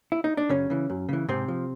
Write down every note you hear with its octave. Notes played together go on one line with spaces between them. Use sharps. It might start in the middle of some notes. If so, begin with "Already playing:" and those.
E4
D#4
D4
F#2 C#3 C#4
C#3 E3
F#2
C#3 E3
G#2 C3 C4
F3